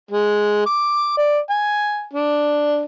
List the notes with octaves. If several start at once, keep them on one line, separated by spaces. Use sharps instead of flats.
G#3
D6
D5
G#5
D4